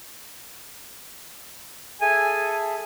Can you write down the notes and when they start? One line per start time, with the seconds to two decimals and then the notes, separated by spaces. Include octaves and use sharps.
2.01 G#4 A4 E5 G#5